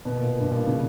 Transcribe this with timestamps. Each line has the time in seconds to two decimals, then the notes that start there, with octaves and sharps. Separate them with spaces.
0.05 B2
0.17 A#2
0.28 A#2
0.40 G2
0.51 A#2
0.67 C#3